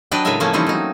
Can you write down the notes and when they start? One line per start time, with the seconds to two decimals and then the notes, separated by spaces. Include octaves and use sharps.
0.11 F#3 D4 B4 D5 D#5 G5
0.25 A2 C#3 G#3 A#4 E5 G#5
0.40 F3 A3 A#3 C#4 G#5
0.53 E3 G3 C4 C#4 D#4
0.67 F#3 D#4